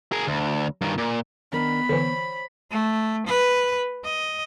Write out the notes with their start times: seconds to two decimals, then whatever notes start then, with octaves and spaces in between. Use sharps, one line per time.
0.12 G#4 A#4
0.27 D2
0.81 G2 D#3
0.98 A#2
1.52 D#3 B3 D4 A#4 B5
1.89 D3 E3 C5 C#5
2.71 A3
3.27 B4
4.04 D#5